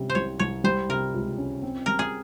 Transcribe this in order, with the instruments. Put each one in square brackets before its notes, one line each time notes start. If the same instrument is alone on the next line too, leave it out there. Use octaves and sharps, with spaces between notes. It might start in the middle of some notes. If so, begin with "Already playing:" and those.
Already playing: [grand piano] C3 G3 C#4
[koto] C5
[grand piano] C2 [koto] C#5
[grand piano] C2 [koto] C#5
[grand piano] G3 [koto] C5
[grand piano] C3 [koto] A#4
[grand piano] C#2
C#4
C4
[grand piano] G3 [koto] A#4
[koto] G#4